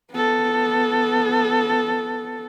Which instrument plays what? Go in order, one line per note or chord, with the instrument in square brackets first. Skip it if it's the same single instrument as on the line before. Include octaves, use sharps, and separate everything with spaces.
[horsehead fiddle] B3 A4